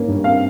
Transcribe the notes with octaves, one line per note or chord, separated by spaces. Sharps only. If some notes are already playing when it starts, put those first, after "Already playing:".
Already playing: G#2 A#3 C#4
G2
C4 F5